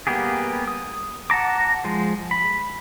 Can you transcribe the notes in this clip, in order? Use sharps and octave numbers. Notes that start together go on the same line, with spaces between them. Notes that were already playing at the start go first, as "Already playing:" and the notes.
G3 A#3 B3 G4 G#4
D#6
F#5 A5 A#5 D6
F3 G#3
B5